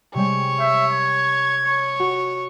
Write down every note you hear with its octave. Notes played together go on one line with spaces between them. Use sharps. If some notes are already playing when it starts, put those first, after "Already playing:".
C3 G3 G#3 C#5
E5 G6
G#6
C#5
F#4